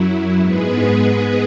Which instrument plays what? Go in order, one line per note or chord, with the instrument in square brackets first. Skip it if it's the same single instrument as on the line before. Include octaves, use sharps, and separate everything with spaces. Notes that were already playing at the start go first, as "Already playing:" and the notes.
Already playing: [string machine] F#2 F#3 E4
G#2 G#3 B3 G#4 B4